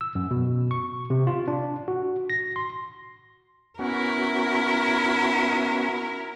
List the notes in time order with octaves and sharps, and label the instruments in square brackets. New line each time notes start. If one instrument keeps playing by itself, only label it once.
[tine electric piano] E6
F#2
B2
C#6
C3
F4
D4
F#4
A#6
C6
[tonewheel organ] B3 C#4 F#4 [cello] E4 A#4